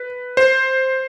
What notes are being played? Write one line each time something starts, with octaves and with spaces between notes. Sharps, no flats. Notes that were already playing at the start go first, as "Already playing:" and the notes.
Already playing: B4
C5